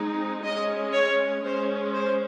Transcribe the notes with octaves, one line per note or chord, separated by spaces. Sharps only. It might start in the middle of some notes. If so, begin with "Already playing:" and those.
Already playing: G#3 C4 D#4
G#3 C#4 D#5
C#5
G#3 C#4 C5
C5